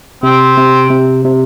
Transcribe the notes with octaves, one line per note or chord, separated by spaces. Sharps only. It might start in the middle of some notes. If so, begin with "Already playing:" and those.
C3 C4
C3
C3
C3